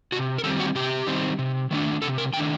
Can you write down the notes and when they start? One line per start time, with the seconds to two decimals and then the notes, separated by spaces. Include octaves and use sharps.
0.12 C3 F#4
0.38 A#4
0.44 D#3 G3 C4 A4
0.60 F#4
0.75 C3 G4
1.07 D#3 G3 C4
1.39 C3
1.71 D#3 A3 D4
2.02 C3 A4
2.18 A#4
2.33 D#3 A3 D4 G5